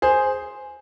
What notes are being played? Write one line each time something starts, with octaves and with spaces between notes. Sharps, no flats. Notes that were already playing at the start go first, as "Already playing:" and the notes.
G#4 C5